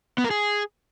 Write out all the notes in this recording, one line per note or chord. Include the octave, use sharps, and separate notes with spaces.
B3
A#4
G#4